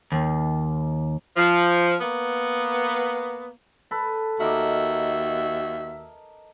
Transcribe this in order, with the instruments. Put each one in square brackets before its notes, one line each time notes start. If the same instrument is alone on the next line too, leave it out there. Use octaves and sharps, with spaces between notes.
[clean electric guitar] D#2
[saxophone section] F3
A#3 B3
[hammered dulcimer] A4 B4
[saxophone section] D#2 F#4 E5 [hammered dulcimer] A#4 D#5 D6